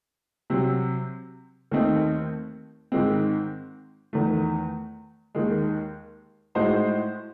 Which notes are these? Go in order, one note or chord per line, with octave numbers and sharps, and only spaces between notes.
C3 F#3 C4
D#2 D#3 A3 C4 D#4
G#2 D#3 G#3 C4
E2 D#3 A3
D#2 D#3 G#3
A2 G#3 D#4 F#4 C5